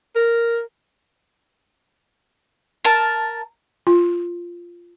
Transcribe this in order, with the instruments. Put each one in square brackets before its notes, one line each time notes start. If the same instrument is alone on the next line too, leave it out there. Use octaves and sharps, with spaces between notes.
[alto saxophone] A#4
[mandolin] A#4 A5
[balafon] F4